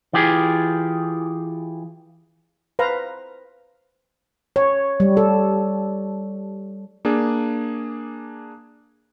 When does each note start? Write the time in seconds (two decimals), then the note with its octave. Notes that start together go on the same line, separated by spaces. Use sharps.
0.13 E3 F4 G4 G#4
2.79 B4 C5 F5 A#5
4.56 C#5
5.00 G3
5.17 A4
7.05 A#3 D4 G#4